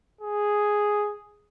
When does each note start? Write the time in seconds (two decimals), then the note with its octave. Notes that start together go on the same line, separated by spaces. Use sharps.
0.21 G#4